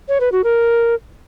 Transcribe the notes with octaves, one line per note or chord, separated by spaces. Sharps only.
C#5
B4
F#4
A#4